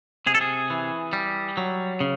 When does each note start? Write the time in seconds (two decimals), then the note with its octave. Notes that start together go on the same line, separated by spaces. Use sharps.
0.27 C3 G#4
0.35 A4
0.41 G#4
0.70 E3
1.13 G3
1.57 F#3
2.00 C#3